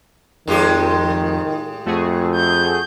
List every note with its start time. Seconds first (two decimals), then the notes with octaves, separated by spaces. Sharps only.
0.48 F2 A2 D#3 G#3 G4
1.86 F2 A3 F#4 G#4
2.36 G6